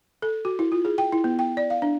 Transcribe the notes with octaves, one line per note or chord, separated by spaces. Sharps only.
A4
F#4
E4
F4
G#4
G5
E4
B3
G5
D5
F5
D4